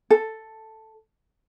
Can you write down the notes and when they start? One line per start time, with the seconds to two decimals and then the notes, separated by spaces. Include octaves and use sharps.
0.10 A4